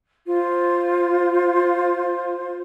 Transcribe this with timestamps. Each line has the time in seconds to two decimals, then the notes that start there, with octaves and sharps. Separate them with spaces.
0.27 F4 C5